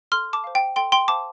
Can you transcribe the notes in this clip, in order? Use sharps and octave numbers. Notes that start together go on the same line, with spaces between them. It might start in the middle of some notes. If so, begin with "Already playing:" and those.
A4 C6 F6
A5 D6
C5 F5
G5
A4 G5 C6
G5 C6
C5 F5 A5 D6